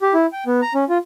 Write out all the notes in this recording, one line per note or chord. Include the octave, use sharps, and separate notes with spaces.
G4
E4
G5
B3
A#5
C#4
F4